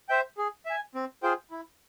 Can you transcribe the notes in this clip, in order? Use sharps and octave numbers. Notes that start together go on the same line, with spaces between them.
C5 E5 G5
G#4
E5 G#5
C4
F4 G#4 C5 G5
E4